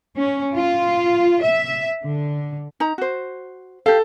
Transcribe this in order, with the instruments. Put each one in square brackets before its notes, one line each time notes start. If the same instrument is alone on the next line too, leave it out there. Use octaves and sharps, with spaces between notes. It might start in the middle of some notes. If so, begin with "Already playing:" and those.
[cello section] C#4
F4
E5
D3
[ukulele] D#4 A#5
F#4 C5
[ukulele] G4 F5 [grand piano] A4